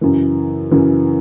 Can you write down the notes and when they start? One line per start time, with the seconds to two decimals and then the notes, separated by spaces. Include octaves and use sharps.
0.01 F#2 C#3 E3
0.71 F#2 C#3 E3